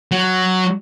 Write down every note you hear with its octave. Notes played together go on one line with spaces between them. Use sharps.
F#3